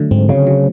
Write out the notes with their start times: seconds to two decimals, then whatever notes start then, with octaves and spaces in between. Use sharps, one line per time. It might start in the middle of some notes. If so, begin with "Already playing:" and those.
Already playing: D3 F#3 A3
0.11 G#2 C4
0.29 C#3 F#3
0.47 F#3